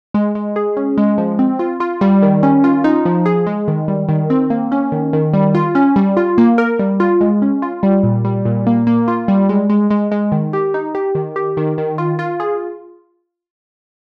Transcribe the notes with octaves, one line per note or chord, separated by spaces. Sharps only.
G#3
G#3
G#4
C#4
G#3
F3
C4
F4
F4
G3
D#3
C#4
F4
D#4
F3
G#4
G#3
D#3
G3
D#3
C4
A#3
C#4
D#3
D#3
G3
F4
C#4
G3
F4
A#3
A#4
G3
F4
G#3
C#4
F4
G3
A#2
G3
A#2
A#3
A#3
F4
G3
G#3
G#3
G#3
G#3
D#3
G4
D#4
G4
D#3
G4
D#3
D#3
F4
F4
G#4